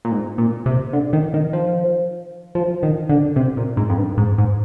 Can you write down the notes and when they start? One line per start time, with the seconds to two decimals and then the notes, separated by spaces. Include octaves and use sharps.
0.05 A#2
0.12 G#2
0.38 A#2
0.66 C3
0.93 D3
1.13 D#3
1.34 D#3
1.53 F3
2.55 F3
2.83 D#3
3.09 D3
3.36 C3
3.57 A#2
3.77 G#2
3.89 F2
3.98 G2
4.17 G#2
4.38 G#2